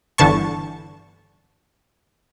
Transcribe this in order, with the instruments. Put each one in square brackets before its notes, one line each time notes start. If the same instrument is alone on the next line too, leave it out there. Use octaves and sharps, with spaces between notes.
[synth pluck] G1 D3 E3 A5 C#6